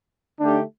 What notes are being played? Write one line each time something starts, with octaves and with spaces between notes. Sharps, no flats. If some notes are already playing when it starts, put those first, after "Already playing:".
D3 A3 D4 D#4 G4